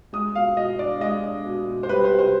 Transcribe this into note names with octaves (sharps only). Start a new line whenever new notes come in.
G#3 D#6
B2 F5
B2 D#5
D4 D5
G#3 D#5
D4
B2
B2
C5
G3 B4
C5
C3
C5